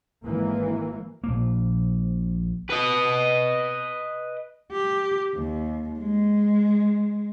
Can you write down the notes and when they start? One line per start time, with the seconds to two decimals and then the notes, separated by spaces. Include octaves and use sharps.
0.24 G#1 E3 A#3
1.24 A#1 A#3
2.70 B4 D#5
4.72 G4
5.35 D#2
5.99 G#3